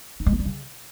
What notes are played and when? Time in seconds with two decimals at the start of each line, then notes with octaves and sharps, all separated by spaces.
0.20 D#4
0.26 G#3
0.33 B3
0.39 G3
0.46 C#3